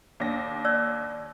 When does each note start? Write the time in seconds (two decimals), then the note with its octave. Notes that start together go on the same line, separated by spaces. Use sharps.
0.20 D#2 D4 A#6
0.65 C#5 D5 E6